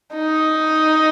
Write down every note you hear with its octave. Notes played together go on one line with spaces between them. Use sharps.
D#4